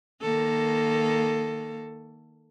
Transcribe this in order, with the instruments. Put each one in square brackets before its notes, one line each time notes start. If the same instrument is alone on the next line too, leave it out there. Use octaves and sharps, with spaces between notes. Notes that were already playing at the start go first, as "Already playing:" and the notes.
[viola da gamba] D#3 A#3 A4